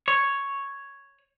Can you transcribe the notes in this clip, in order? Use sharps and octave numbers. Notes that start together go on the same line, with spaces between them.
C#5